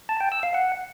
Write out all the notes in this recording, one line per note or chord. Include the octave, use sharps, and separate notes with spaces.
A5
G5
E6
F5
F#5